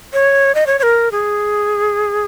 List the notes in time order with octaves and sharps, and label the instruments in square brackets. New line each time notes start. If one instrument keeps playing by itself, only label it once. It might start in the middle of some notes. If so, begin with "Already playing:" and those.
[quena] C#5
D#5
C#5
C#5
A#4
G#4